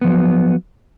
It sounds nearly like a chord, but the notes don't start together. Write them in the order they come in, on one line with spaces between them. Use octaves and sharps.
B3 F3 F#3